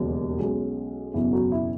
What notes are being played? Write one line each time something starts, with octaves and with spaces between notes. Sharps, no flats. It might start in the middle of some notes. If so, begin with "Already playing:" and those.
Already playing: E1 D#2 C#3 F#3
B1 B2 G#3 C#4
F#1 E2 B2 E4
F#3 F#4
E4